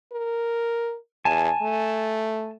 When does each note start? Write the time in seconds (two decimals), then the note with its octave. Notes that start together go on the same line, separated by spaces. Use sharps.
0.12 A#4
1.25 E2 G#5 A5
1.62 A3